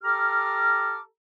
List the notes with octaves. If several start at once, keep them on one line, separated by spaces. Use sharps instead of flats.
G4 A4 A#5 D6 F6